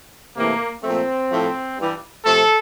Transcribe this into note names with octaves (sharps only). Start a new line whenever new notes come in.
C3 E3 A3 A#3
A#2 F3 A3 C4
A2 F3 A3
G2 E3 G3
C3 F3 A3 A4